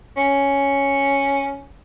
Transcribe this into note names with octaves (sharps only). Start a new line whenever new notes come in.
C#4